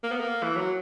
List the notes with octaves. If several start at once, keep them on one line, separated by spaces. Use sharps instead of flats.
A#3
B3
A#3
E3
F#3